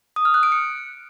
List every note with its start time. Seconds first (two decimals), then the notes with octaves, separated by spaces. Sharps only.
0.16 D#6
0.25 F6
0.34 F#6
0.43 D7
0.52 C#7